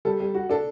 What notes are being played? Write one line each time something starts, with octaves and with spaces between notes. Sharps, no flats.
G3 A4
G3
F#4
D4 A4